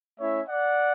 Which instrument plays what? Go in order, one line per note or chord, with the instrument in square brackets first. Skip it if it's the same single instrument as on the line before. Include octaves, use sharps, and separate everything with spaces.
[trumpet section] A3 C#4 E4 C#5 E5
D5 F#5